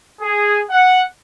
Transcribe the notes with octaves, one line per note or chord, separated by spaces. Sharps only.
G#4
F#5